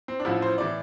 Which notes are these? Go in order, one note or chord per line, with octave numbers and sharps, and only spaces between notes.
C4
D4
A1 A2 F3 E4
C5
A2 E3 D5